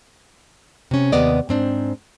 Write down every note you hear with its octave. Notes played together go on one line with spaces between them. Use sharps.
C3 C#4
D#2 C3 B3 D5 D#5
G#2 C4 D4